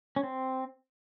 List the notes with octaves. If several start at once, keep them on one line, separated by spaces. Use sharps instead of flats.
C#4
C4